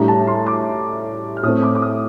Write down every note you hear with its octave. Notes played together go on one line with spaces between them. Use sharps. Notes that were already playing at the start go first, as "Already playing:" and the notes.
Already playing: A2 G3 D4 A#5
A5
C6
D6
F6
A2 A3 C4 D#6
D6
D6
D#6